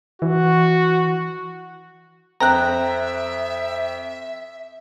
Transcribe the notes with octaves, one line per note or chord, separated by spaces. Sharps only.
E3 F#4
F2 C4 E5 G5 A#5 F#6